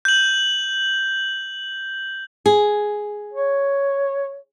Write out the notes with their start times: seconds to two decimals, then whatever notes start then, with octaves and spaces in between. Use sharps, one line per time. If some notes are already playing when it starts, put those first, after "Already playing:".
0.05 G6 F#7
2.46 G#4
3.33 C#5